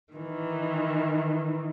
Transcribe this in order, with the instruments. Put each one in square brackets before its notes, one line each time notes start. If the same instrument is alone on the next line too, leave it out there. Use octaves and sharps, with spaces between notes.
[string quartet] D#3 E3